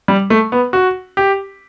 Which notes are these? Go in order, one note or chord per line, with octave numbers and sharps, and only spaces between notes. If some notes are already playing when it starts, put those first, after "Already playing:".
G3
A3
B3
F#4
G4